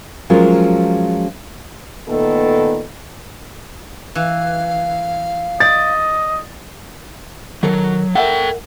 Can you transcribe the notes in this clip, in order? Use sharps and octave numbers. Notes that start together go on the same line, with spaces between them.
F3 F#3 G#3 C#4 F4 A#4
A#2 D#3 A3 B3 A4
E3 F5
D5 D#5 A6
D#3 F#3 A4 A#4
A4 A#4 E5 F#5 G5